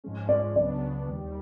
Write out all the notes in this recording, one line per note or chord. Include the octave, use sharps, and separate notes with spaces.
G#2 F3 G#3 C#4
D5
C#2 C#3 F#3 B3 D4 D5
D#2 D#3 G3